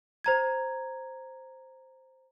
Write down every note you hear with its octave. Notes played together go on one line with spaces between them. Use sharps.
C5 A#5 G#6